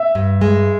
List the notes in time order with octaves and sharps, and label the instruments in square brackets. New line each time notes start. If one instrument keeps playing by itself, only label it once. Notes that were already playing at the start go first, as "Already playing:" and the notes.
Already playing: [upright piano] E5
[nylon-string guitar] G2
G#3